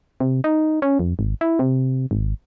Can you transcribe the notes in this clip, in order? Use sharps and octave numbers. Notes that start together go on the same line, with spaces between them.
C3
D#4
C#4
F2
G#1
E4
C3
G#1